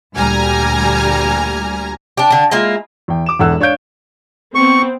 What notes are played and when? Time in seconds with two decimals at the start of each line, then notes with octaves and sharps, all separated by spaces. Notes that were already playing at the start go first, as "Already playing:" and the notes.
0.16 D2 A#2 G3 G#5 A#5 F6
2.17 D4 G4
2.30 D3 D4
2.51 G#3 A#3 E4 F4
3.08 E2 G5
3.26 D6 E7
3.39 E1 E2 A4 F#5 E6 F#6
3.60 D4 C#5 F5 G6 D7
4.55 B3 C4 C#6